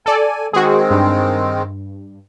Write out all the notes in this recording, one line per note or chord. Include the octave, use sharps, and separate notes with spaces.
A4 D5 G#5
D#3 G#3 C4 F#4 G#4
G2